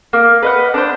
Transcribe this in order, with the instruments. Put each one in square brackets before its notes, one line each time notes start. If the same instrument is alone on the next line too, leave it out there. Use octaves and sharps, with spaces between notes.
[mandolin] A#3
B4 D#5 F#5
D4 C5